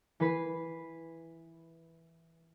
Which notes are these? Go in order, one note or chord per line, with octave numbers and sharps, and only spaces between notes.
E3 B4 B6 C7